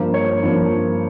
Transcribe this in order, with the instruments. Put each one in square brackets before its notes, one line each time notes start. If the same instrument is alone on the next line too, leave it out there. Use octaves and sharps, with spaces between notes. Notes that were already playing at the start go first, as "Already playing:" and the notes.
Already playing: [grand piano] G2 F3 A#3 C5
C#5
G2 F3 A#3